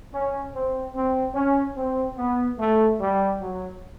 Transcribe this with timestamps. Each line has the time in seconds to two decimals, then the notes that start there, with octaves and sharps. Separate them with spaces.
0.13 C#4
0.54 C4
0.95 C4
1.35 C#4
1.76 C4
2.17 B3
2.58 A3
2.99 G3
3.40 F#3